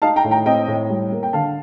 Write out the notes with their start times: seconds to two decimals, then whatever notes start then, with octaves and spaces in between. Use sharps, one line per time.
0.02 D#4 F5 A5
0.16 G5 A#5
0.24 A2
0.31 G5 A#5
0.46 C4 D#5 G5
0.68 A2
0.90 G3
1.12 A#3
1.23 G5
1.33 D3 F5 A5